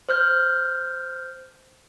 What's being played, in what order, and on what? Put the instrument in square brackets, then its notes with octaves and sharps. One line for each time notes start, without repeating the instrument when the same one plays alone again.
[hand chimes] C5 F6 G6